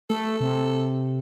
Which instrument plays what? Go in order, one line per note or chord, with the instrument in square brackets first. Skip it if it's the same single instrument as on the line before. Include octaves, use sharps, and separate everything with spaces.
[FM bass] A3 [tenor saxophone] A4
[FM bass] C3